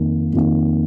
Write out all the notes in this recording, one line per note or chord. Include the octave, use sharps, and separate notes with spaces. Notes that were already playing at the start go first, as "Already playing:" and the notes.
Already playing: F2 D#3 A#3
F2 D#3 A#3